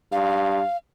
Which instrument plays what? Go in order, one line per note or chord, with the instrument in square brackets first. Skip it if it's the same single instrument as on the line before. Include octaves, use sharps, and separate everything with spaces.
[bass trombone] G2 [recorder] F5